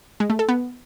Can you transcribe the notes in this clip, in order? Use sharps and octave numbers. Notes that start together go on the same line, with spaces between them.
G#3
A3
A4
B3